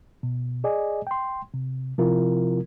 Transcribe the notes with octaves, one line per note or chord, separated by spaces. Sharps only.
B2
G#4 D5 D#5 G#5
G5 C6
C3
C3 F3 C4 E4 F4 A#4